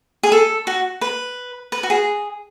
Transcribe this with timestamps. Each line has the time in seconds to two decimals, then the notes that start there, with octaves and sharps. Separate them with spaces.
0.23 G#4
0.32 A4
0.67 F#4
1.01 B4
1.72 B4
1.83 F#4
1.90 G#4